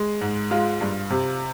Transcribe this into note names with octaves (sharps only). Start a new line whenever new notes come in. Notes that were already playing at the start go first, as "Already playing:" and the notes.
Already playing: G#3
G#2
G#3 F4
G2
C3